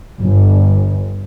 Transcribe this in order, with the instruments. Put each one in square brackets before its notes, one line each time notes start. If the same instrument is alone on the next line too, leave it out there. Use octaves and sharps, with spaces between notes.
[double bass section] G1